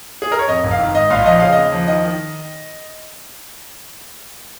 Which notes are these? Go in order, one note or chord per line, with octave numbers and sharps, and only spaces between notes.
G#4
A#4
C#5
F2 D#5
F1
F5
D#3
G#2 D#5
A#1 F5
F3 D#5
C#3 F5
D#2 D#5
F3
D#3 D#5
D#3